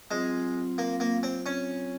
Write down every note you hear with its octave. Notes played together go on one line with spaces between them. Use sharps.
F#3 G#3 C4 F4 C5
A#3
A#3
C4
C#4